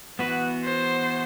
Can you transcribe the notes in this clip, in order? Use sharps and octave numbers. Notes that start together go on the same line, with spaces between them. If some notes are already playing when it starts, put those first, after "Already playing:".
E3 B3 F#4 B4
C5